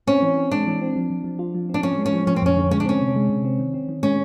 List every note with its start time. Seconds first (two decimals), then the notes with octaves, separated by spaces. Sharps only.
0.07 C4 C#4
0.22 E3
0.37 C4
0.51 G#3 D4
0.67 E3
0.82 C4
0.96 F3
1.10 F3
1.24 F3
1.39 F4
1.55 F3
1.69 C4 D4
1.83 F3 C#4
1.98 G#3
2.06 C#4
2.13 F3
2.27 F3 C#4
2.36 C4
2.42 F2 C#4
2.57 D3
2.71 G#3 C#4
2.80 D4
2.85 C4 C#4
3.00 C3
3.16 G#3
3.30 C3
3.45 C4
3.59 D#3
3.74 C4
3.89 D#3
4.03 G#3 C#4